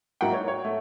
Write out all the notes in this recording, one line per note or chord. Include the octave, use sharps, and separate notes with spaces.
G#2 F#3 A#3 E4 F#5 G5
C#5
C#5
A3